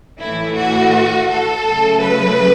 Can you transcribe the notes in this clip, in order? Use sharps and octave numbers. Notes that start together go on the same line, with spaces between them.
A2 E3 A3 E4
F#4
A4
C#3 F#3 A3
B4